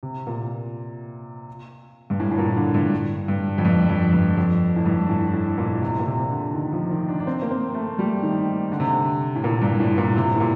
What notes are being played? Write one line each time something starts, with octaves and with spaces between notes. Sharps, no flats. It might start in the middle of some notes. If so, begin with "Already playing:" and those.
C3
A#2
G2
A2
A2
A#2
D3
G2
G2
F2
G2
F2
G2
F2
A2
G2
A2
A2
A#2
C3
A#2
C3
D3
D#3
F3
D#3
D4
D4
C4
A#3
C4
A3
G3
D#3
D3
C3
D3
A2
A#2
G2
A2
A#2
C3
A2
A#2